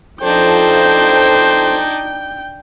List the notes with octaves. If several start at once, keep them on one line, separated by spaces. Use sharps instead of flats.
F2 F3 D4 D#4 A4 C5 G5 G6